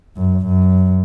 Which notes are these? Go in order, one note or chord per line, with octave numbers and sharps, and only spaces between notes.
F#2
F#2